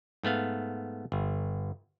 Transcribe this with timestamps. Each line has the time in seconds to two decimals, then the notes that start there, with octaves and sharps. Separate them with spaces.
0.23 G#2 A3 B3 F5
1.12 G1